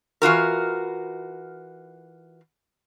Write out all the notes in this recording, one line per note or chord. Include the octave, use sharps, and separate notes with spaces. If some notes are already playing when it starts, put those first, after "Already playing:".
E3 F4 F#4 A#4